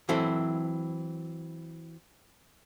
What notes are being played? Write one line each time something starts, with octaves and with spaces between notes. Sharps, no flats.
E3 F#3 C4 E4 A4